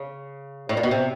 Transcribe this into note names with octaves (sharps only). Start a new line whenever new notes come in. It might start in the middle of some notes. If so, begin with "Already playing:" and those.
Already playing: C#3
A2
A#2
B2
C3